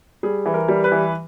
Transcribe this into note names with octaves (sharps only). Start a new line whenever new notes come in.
G3 G#4
E3
A#4
G3
B4
E3